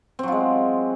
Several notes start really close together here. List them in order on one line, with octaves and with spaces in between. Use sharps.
C4 F#3 F4 G#3